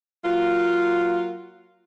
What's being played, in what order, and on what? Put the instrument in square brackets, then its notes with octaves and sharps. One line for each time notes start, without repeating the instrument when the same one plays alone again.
[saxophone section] F#3 A#3 F4